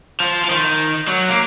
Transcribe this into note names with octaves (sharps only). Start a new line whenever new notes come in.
F3
F3
D#3
F#3
A#3